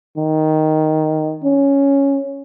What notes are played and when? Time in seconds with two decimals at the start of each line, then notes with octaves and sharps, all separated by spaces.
0.17 D#3
1.43 C#4